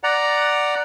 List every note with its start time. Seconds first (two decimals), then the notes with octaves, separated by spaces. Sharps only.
0.03 D5 F#5 A#5